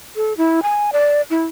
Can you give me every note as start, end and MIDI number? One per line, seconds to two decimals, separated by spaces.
0.16 0.33 69
0.37 0.60 64
0.63 0.90 80
0.92 1.21 74
1.30 1.44 64